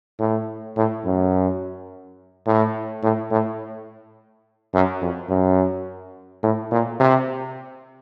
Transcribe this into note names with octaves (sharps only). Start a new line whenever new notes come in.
A2
A2
F#2
A2
A2
A2
F#2
F2
F#2
A2
A#2
C3